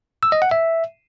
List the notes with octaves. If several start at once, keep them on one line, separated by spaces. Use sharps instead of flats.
E6
D#5
F#5
E5